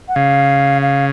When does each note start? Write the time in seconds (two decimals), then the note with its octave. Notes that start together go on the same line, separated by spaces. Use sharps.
0.08 F#5
0.16 C#3 F5
0.82 F5